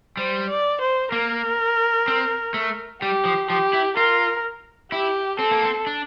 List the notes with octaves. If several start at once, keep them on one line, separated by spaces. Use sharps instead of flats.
G3 C5
D5
C5
A#3 A#4
C4
A3
G3 G4
F3
F3 G4
E4
F4 A#4
E4 G4
C4 A4
A#3
C4
D4